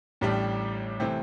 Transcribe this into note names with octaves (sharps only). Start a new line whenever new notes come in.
A1 A2 G3 D4 G4
C3 E3 A3 C4